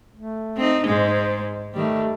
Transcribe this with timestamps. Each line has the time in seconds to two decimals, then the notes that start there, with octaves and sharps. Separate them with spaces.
0.15 A3
0.57 C4 D#4
0.86 G#2 G#3 C5
1.74 D#3 G3 A3